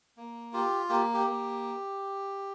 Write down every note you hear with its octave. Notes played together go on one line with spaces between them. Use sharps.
A#3
F4 G4
A#3 G4
G4
A#3